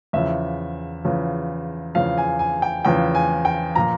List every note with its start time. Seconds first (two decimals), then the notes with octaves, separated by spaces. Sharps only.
0.13 E2 C#3 F3 E5
1.05 E2 C#3 F3
1.95 E2 C#3 F3 F5
2.18 G#5
2.39 G#5
2.62 G5
2.85 E2 C#3 F3 G5
3.15 G#5
3.45 G5
3.75 A#2 F3 A#5